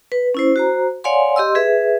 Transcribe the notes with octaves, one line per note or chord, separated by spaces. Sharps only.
B4
C#4 E4 C5
F#4 C5 A#5
C#5 D5 F5 F#5 G#5 C6
G4 D#5 C6 E6
G#4 B4 E5